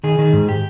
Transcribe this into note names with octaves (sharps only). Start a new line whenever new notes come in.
D#3 G#4
D#3
G#2
G4